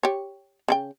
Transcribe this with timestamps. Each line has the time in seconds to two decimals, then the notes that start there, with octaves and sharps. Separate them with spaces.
0.03 G4 C#5
0.68 C#3 E4 G5